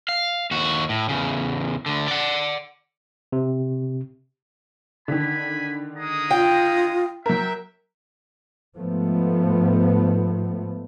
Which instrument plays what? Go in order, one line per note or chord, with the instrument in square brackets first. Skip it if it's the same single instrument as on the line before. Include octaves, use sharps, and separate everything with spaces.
[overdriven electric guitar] F5
D#2 F#4
A2
E2 C#3
D2 D3
D5 F#5
[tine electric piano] C3
[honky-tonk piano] D3 D#3 [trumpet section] G#5 B5
[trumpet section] G#3 A#5 D#6
[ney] F4 [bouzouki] G5
[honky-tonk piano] F#3 A#4 [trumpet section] E5 G5
[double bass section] G#2 F3 A3 B3